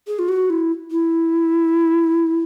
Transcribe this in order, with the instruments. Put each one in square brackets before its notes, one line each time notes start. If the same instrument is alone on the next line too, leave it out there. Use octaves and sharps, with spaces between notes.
[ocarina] G#4
F4
F#4
E4
E4